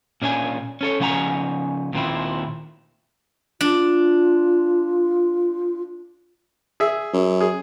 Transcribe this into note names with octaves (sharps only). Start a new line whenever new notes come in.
A#2 C#4 D4 D5 G#5
C#4 A4 C#5
C#3 F3 C#4 F#5 G#5 A#5
D#2 A#2 C4 E4
D4 F4
G#4 E5
F#2
G#4